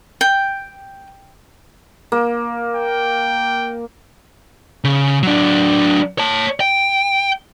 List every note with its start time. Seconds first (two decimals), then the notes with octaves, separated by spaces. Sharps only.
0.21 G5
2.12 A#3
2.76 G5
4.84 C#3
5.23 F#3 D4
6.18 C#5 A5
6.60 G5